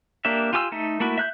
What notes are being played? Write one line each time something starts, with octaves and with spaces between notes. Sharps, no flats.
A#3 D4 G4 E5
F4 G4 G#5 D6 E6
A3 D#4 E5
A3 A#3 E4 F#4
E5 F#6 G6